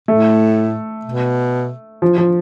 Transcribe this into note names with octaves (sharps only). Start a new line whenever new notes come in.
A2 A3
B2
F3
F3